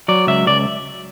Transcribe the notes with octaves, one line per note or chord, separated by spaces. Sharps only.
F#3 D5
C#2 E5
C#2 D5